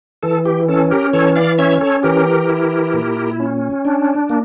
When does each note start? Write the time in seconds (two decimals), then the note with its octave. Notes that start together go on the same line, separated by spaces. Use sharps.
0.23 E3 A4
0.45 G4
0.68 C#4 A4
0.91 G4 A#4
1.13 E3 A4 C#5
1.36 D5 F5
1.58 C#4 C#5 E5
1.81 A4 C#5
2.03 E3 G4 A#4
2.49 E4
2.94 A#2
3.40 C#4
3.85 D4
4.30 A#3